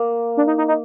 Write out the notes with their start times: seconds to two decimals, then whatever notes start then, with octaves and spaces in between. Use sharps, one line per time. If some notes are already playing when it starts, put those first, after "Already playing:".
Already playing: A#3
0.37 D4
0.47 D#4
0.58 D#4
0.68 D#4